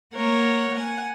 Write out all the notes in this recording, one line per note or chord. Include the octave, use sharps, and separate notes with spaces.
A#3 A#4 C#5 F#5
F#5 G#5